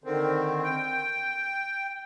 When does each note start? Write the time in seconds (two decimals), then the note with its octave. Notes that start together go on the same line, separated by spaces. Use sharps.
0.04 D3 D#3 C4
0.63 G5